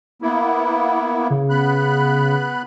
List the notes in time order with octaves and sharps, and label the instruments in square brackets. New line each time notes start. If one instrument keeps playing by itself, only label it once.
[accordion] A#3 B3 E4
[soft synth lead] C#3
[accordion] B3 B5 F#6